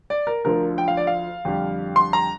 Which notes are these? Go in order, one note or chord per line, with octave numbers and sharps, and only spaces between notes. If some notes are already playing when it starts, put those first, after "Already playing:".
D5
A#4
D2 D3 F3 A#4
G5
F5
D5
F5
F2 D3 G3
C6
A#5